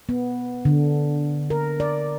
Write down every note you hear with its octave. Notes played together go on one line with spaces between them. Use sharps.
B3
D3
A#4
D5